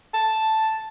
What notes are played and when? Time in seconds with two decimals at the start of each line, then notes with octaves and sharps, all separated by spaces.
0.14 A5